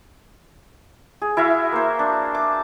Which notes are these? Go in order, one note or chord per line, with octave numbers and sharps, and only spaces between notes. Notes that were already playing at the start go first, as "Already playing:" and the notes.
G#4
E4 F#4 E5 F5
A#3 C5
D4
D6